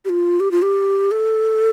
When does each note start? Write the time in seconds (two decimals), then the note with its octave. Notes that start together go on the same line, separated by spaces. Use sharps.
0.05 G4
0.09 F4
0.40 G4
0.51 F4
0.62 G4
1.11 A4